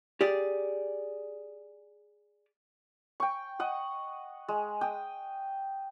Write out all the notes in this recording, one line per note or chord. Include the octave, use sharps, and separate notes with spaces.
G4 G#4 D5
G5 C#6
D#5 F#5 D#6
G#3
G5 D#6